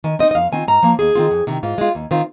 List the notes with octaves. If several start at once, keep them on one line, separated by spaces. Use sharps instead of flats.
D#3 G#5
C4 D#4 D#5
D#5
F2 F5
D#3 C4 F4 G#5
G#2 A#5
F3 A#3
D#2 G#4
D#3 C4 F4
F2
C3 D#3
G#2 F4
G#3 F4
D#2
D#3 C4 F4